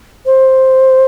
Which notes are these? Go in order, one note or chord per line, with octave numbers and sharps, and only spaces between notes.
C5